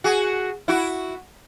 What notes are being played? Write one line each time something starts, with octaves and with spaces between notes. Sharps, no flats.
F#4 G#4
E4 F#4